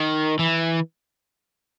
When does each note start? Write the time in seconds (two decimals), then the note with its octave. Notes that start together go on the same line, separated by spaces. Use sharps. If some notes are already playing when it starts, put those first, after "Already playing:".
Already playing: D#3
0.39 E3